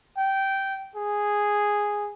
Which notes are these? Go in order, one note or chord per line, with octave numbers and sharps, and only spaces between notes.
G5
G#4